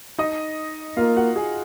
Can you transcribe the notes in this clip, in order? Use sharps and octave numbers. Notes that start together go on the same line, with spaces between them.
D#4 D#5
A#3 F4 F5
F#4 F#5
G#4 G#5